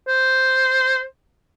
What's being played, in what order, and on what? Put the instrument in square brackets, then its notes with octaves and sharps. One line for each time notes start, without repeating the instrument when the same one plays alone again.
[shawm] C5